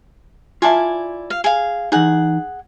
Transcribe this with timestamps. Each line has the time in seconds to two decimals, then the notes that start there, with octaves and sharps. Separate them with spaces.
0.62 E4 F4 D5 G#5 A5
1.30 F5
1.44 G#4 F5
1.92 E3 D#4 G#4 F#5